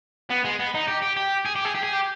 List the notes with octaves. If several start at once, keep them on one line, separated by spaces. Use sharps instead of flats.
B3
G#3
B3
D#4
G4
G4
G4
G#4
G4
G#4
G4
G#4
G4